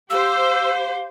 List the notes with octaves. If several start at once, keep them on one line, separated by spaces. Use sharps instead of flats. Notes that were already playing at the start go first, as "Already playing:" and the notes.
G4 C5 F5 E6